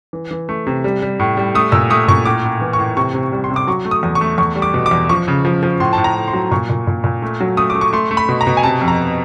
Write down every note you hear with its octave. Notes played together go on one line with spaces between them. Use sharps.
E3
E3
A3
C3
G3
G3
A2
G3
A3 D#6
A#2 E6
A3 D#6
A#2 C#6
A2 D6
A2
E3
C#6
A2
C3 C#6
C3
G3
C6
C3
D6
F#3 C#6
A3
D#6
E2
C#6
A3
E2 C#6
G3
D6
B2
D6
E2
F3 C#6
C#3
F3
F3
A2 C6
A5
A2
A#5
A2
C6
F#3
A#2 C#6
A#2
A#2
A#2
A3
F#3
A3 D#6
D6
A3
C#6
A3 C6
A3
B5
B2
A#5
B2
G#5
C3 A5
F2
A#5